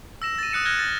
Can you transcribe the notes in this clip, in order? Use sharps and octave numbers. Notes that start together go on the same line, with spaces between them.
E6 A#6 E7
A6 D#7
D#6 F#6 C#7 D#7 E7
F6 F#6 G#6 A#6 C#7
A6